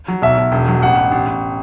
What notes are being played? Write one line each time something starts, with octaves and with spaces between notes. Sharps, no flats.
F#3
B1 E5
B1
E1
F#3
A1 F#5
A1
A1
A1